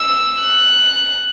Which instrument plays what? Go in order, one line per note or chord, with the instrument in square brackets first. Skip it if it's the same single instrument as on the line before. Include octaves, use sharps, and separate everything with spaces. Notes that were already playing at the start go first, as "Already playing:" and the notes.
Already playing: [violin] E6
F#6